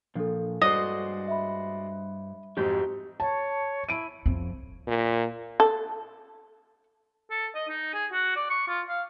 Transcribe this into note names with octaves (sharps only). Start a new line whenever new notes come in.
A#2 F3 D4 A4
G2 G#3 F#4 C5 D5 D#5
E5 B5
F2 G#2 F#4 G4
C#5 A5
E4 D7 D#7
F2
A#2
A4
A4
D#5
D#4
G#4
F#4
D5
C#6
F4
F5